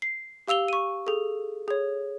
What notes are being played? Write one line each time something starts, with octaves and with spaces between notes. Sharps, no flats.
C7
G4 F5 E6 F7 G7
C#6 D#7
G#4 A4
G#4 C#5